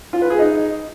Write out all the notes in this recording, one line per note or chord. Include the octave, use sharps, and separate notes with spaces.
F4
B4
G#4
D#4